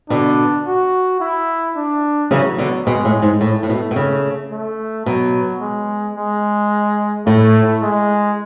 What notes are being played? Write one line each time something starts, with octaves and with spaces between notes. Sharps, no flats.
B2 D3 D4
F#4
E4
D4
C#3 E3 F#3
B2 D3
B2 G#3
A2
G#2
A2 A3
A2
B2
B2
C#3
A3
B2 F#3
G#3
G#3
A2 A3
G#3